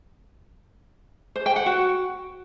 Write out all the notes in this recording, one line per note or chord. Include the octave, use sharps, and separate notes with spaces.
C5
G5
F#5
F#4